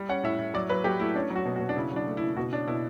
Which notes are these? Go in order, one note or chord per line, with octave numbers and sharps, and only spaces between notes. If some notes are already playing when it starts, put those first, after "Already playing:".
Already playing: G3
C#4 F#5
A2 E5
A2
F#3 D5
F#3 B4
F#3 G4
A3 E4
C#4 D4
F#3
F#4
B2
F#4
B2
D4
C#3 E4
F#3 D4
A3
E4
C#3
E4
B2 F#4
C#4 D4
B2 E4